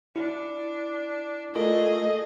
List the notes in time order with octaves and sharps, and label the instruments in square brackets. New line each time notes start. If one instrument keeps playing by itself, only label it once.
[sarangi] D4 [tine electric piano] E4
[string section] A3 [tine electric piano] F4 A#4 [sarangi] G#4 [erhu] D#5